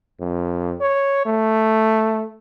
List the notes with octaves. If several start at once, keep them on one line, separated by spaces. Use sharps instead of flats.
F2
C#5
A3